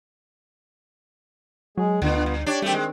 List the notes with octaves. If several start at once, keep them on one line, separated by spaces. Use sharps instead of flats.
F#3 G#3 G#4
D2 D3 B3 F4
G2
D4 G4 C#5 D5
D#3 G3 A3 C4 G4
G#3